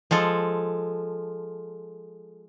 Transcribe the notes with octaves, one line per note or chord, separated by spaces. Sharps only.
F3 G#3 A4